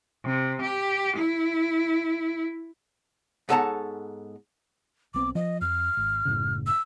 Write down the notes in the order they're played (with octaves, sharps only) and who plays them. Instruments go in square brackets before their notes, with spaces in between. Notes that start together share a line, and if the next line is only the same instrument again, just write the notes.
[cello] C3
G4
E4
[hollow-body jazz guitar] G#2 B3 A4 C#5 A5 A#5
[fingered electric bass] B1 B3 C4 [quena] D6
[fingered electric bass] F3 [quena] D#5
[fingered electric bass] F2 [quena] F6
[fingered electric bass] G#1
F#1 A2 C#3
[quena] E6